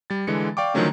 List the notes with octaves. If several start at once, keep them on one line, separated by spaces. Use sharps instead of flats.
G3 A6
D3 E3 G#3 C#7
D5 F5 G5 C#6 D6
D3 D#3 F3 F#3 A3 C#4